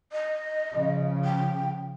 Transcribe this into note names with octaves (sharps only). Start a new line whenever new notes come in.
D#5
C#3 F3
G5